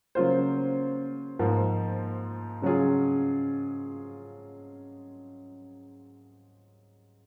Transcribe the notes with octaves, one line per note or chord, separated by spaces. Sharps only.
C#3 F#3 A#3 F4 C5
G#2 F3 A#3
C#3 F#3 C#4 F4 G#4